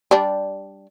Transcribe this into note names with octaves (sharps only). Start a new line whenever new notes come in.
G3 D4